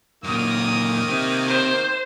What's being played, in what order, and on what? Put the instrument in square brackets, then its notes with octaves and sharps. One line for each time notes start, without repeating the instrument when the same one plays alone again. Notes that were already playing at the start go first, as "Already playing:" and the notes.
[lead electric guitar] F#2 A#2 [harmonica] D#3 A#3 [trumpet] D#6
[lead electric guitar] C4 G4
[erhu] C5